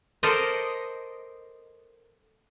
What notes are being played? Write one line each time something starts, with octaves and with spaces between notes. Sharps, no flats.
A4 A#4 C5 D5 D#5